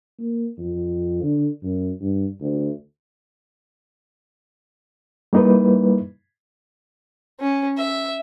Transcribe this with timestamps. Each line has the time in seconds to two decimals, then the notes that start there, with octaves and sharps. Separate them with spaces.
0.19 A#3
0.58 F2
1.23 D3
1.63 F#2
2.00 G2
2.40 D2
5.33 G3 A#3 D#4 E4 B4
7.40 C#4
7.77 E5